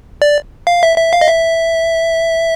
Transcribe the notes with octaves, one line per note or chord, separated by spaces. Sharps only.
D5
F5
E5
E5
F5
D#5
E5